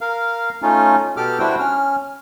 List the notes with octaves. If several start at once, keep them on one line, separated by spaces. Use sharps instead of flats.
A#4 F5
A3 C#4 D#4 F4
B2 G4 A4 D6 F6
G3 D4 E4 F#4 C5 G5
C#4 F6